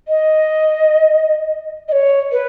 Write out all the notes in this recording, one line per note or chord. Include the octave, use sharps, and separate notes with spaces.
D#5
D#5
C#5
B4